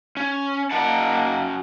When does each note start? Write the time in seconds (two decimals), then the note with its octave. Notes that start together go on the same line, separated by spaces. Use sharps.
0.17 C#4
0.71 F#2 A#3 D#4 F#5 A5